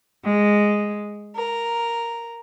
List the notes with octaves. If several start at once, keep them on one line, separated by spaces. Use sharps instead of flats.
G#3
A#4